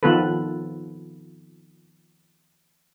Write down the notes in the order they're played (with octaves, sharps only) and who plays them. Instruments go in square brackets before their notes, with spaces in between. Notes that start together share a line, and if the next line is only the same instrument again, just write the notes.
[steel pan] D#3 F3 B3 F4 A4 B4